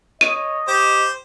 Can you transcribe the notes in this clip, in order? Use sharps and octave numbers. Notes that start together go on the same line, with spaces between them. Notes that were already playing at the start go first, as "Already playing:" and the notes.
C#5 D#5 D#7
G4 C5